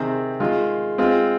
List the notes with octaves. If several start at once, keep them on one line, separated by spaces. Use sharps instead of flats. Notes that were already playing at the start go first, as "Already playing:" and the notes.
Already playing: C3 D#3 C4 G#4
D#3 G#3 F4
G#3 C4 F4